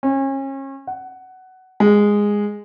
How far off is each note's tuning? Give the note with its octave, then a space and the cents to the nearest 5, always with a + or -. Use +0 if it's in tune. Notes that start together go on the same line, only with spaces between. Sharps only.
C#4 -35
F#5 +15
G#3 -10